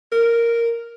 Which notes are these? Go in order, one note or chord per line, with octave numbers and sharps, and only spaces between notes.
A#4